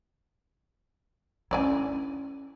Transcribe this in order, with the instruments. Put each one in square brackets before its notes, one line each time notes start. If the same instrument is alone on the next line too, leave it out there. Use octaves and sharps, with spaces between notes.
[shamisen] D3 D5 G#5 [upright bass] C#4 E4